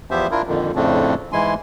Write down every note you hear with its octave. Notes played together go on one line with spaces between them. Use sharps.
E2 F3 B3 G4 C5 E5
D4 E4 F4 A#4
F2 A#2 D3 D#3
F2 A2 C#3 A3 C4 D4
G#2 E3 G#3 E4 G#5 C6